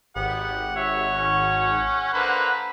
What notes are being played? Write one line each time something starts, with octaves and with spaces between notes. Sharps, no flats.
G#1 B3 G4 F#5
C#5 E5 F#5
C#4
D3 A#3 B4 C5